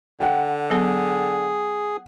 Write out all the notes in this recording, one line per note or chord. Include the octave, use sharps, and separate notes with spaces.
D3 F#5 G5
F#3 B3 G#4 A4